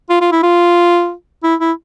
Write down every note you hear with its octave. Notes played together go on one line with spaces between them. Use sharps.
F4
F4
E4
F4
E4
E4